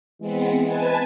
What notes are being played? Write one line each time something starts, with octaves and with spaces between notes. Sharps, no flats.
E3 G#3 B3 C4
B4 G#5 A5